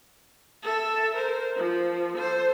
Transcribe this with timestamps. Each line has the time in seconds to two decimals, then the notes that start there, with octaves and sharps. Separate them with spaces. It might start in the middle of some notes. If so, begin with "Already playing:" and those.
0.63 A4 E5
1.15 A#4 C5
1.57 F3
2.14 A4 C5